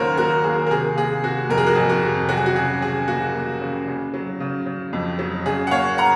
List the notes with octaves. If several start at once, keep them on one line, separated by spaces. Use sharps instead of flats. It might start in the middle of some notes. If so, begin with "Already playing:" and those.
Already playing: D#2 C#3 F#3 F#4 A#4 C5 C#5
A#3 F#4 A#4
D#2 G#4
A#4
C3 G#4
A#3 G#4
C3 F#4
F2 A#4
G#4
F#4
F2 G#4
F#4
C3
F#3 F#4
G#4
F#4
C#3 G#4
C#3 G#4
A#3 F#4
A#3
C#3
C#3
F#3
C#3
C#3
F2
F#3
C#3 G#4
F#5
A#3 C#5 F5
F#5 A#5